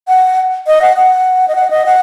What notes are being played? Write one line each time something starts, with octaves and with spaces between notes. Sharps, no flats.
F#5
D#5
F#5
F#5
D#5
F#5
D#5
F#5